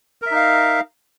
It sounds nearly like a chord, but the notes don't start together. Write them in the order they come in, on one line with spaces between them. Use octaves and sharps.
A#4 E5 D#4 F5